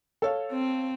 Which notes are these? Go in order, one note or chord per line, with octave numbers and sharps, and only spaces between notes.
A4 C#5 F5
C4